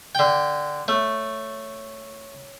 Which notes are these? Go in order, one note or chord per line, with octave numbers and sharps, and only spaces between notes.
D3 G5
A3 C#5